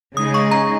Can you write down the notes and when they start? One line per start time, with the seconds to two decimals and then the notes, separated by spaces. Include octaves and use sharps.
0.16 C#3 G#3 D#4 G#4 D#6
0.34 C#6
0.51 A#5